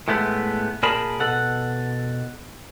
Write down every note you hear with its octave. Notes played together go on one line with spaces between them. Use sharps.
A2 G#3 A3 B3
A#2 G#4 A#4 A5 B5
B2 A4 F#5